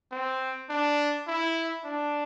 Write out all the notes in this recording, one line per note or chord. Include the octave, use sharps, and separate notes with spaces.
C4
D4
E4
D4